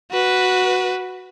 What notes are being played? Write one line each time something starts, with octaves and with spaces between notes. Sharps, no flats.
F#4 B4